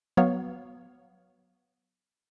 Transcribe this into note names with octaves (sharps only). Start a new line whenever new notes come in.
F#3 B3 C#5 F5